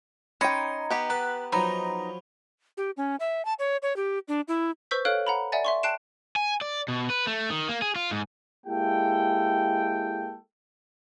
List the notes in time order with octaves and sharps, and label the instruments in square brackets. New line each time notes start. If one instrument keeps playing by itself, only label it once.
[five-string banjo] C#4 G5 [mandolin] D#4 [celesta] B5 G#6 C#7 [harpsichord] C6
[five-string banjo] B3 G4 F#5
[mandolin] B4 [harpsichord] A5 [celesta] A#5
[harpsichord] F3 F#3 [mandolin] D#4 [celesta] B5
[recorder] G4
C#4
E5
A5
C#5
C#5
G4
D4
E4
[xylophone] B4 C5 C#6 E6 G6 B6
A4 C#5 F5 F6 F#6 D7
F#5 A#5 B5
D5 E5 F#5 G#5 A6
E5 C6 C#6
G5 A5 F#6 C7 D7 E7
[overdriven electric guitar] G#5
D5
B2
B4
A3
D#3
A#3
G#4
F4
G#2
[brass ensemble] G#3 A#3 E4 G4 A4 G5